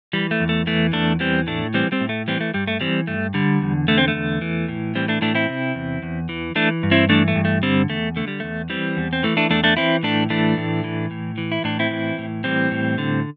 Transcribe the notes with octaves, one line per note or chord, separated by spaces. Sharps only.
E3 G3
A3
E2
A3
E3 A3
E2 A3 D4
E3 G3 C4
A2 A3 D4
E3 G3 C4
G3 C4
A2
A3
E3 G3 C4
A3
G2 G3
A3
E3 G3 C4
G2 A3
D3 G3
E2
D3 A3
C4
A3
E2
E3
A2
E3 G3 C4
A3 D4
A2 A3 D4
C4 E4
C3
E2
E2
E3
E3 A3 D4
G2
C4 E4
E3 A3 D4
A3
G2
A3
D3 G3 C4
E2 A3
D3 A3
G3
E2 A3
E3 G3 C4
E2
C4
E3 A3
A3 D4
E2 A3 D4
A3 D4
E3 C4 E4
A2 A3 D4
E3 A3 D4
A2
E3
A2
E3
E4
A2 D4
C4 E4
E3
A2
E3 G3 C4
A2
D3